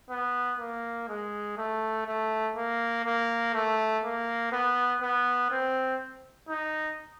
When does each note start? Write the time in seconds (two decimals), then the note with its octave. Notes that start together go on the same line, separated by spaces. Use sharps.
0.10 B3
0.60 A#3
1.09 G#3
1.58 A3
2.06 A3
2.56 A#3
3.05 A#3
3.54 A3
4.04 A#3
4.52 B3
5.02 B3
5.51 C4
6.49 D#4